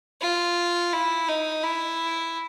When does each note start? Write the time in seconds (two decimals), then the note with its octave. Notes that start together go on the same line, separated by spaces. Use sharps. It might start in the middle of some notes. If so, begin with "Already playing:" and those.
0.21 F4
0.93 E4
1.28 D#4
1.63 E4